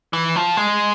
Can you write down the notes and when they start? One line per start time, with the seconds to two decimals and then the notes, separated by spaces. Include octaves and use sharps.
0.13 E3
0.36 F3
0.57 G#3